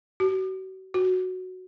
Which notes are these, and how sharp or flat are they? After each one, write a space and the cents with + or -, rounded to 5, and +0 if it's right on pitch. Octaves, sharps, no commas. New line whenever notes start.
F#4 +40
F#4 +0